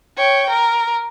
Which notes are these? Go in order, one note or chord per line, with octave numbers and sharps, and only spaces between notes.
C#5 G5
A#4